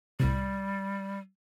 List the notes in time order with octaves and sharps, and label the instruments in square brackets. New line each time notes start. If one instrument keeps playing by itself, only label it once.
[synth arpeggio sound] C2 A2 C3 [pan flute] G3